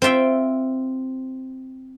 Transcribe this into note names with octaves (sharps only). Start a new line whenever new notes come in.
C4 F4 E5 G5